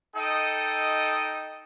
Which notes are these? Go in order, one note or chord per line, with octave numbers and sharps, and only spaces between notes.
D#4 A4 D#5 G5 D#6